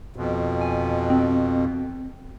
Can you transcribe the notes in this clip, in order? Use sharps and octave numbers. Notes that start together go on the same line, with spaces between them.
F2 B2
G#5
C4